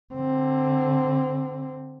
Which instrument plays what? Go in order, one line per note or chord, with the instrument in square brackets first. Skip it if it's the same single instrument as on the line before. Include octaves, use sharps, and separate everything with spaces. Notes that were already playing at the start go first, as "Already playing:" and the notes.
[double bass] D3 C4